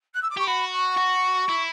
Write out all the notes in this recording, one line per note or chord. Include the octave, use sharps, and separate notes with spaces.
F#6
E6
D6
G4 C#6
F#4 B5
C#6
F#4
E4